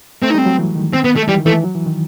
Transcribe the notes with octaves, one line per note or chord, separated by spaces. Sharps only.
A3 C4
D#4
G3 C4
F#3
E3
D#3
C4
B3
A3
E3 G3
D#3
E3 A3
F#3
E3
D#3